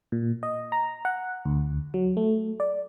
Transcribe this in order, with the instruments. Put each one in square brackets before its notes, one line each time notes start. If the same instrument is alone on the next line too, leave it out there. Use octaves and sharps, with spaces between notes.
[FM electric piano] A#2
D#5
A#5
F#5
D2
F#3
A3
D5